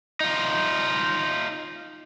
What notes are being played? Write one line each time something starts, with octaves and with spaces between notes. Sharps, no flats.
D#4 F4